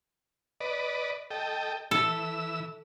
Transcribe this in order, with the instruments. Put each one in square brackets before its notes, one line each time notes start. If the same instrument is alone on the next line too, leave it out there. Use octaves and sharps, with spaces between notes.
[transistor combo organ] B4 D5 D#5
A4 D#5 G5
[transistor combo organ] E3 E6 [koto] A4